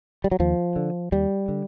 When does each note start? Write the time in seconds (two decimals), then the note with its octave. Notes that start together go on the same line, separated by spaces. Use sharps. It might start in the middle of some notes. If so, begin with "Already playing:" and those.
0.24 G3
0.31 F#3
0.39 D#2 F3
0.76 D3
1.12 D#2 G3
1.48 D3